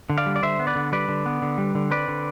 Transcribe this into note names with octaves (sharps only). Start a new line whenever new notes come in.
D3
D5 F5
G3
D5
D3 C5 E5
B3
B4 D5
D3
G3 B4 D5
D3
B3
D3
G3
D3
C4 B4 D5
D3